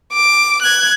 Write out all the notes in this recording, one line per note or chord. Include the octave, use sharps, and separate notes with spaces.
D6
F#6 G#6